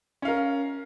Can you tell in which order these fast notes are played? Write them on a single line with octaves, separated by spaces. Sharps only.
C#4 F5 A#4